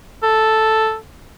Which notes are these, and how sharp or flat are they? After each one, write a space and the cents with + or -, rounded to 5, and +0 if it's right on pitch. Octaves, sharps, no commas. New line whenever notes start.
A4 +0